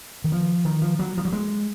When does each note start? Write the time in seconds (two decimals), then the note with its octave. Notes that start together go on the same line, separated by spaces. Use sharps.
0.24 D#3
0.32 F3
0.65 D#3
0.82 F3
0.99 F#3
1.18 F3
1.25 F#3
1.33 G#3